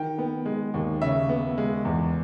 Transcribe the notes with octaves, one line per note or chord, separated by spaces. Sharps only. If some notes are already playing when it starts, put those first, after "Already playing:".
Already playing: D#3 G5
B3
G#3
D#2
C#3 E5
B3
G#3
E2